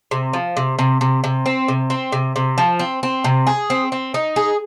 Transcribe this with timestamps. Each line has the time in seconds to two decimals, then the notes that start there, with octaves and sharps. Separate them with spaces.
0.11 C3
0.33 F3
0.57 C3
0.79 C3
1.01 C3
1.24 C3
1.46 C4
1.68 C3
1.90 C4
2.12 C3
2.36 C3
2.58 F3
2.79 C4
3.03 C4
3.24 C3
3.47 G#4
3.70 C4
3.92 C4
4.14 D#4
4.36 G#4